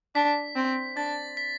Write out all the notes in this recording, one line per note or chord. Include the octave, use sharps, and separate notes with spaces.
D4 B6
C4
D4 A6
B6